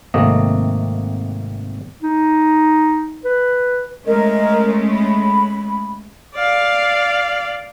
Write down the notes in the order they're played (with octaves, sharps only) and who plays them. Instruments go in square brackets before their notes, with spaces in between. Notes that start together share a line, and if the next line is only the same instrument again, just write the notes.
[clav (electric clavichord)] G#1 C3 A3 A#3 D#5
[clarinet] D#4
B4
[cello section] G#3 A3 C#4 [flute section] A#4 D#5
[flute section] B5
[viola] D5 F5